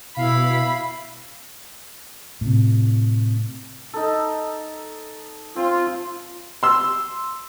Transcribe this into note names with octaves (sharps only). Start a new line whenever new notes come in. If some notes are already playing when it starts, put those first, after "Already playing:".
B2 E4 F5 B5
A2 C3
D#4 A4
C4 F4
C6 E6